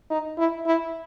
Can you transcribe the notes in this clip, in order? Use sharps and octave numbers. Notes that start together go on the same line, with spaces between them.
D#4
E4
E4